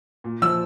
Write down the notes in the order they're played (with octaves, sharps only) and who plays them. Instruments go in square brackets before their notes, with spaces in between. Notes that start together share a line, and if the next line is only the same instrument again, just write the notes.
[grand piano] A#2
F3 E6